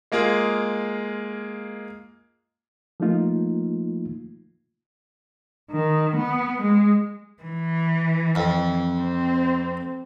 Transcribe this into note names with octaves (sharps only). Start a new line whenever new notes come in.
G#3 A#3 F4 G#4
F3 A3 A#3 D#4 F4
D#3
B3
G#3
E3
F2
C4